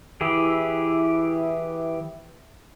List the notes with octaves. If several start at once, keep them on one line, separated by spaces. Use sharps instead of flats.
E3 E4 G4 G#4